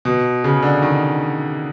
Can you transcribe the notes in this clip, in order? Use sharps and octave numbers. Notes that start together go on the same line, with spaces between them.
B2
C#3
D3
D#3